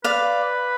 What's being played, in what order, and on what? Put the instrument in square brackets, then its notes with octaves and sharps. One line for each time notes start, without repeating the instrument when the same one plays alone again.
[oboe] B4 [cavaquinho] D5 F5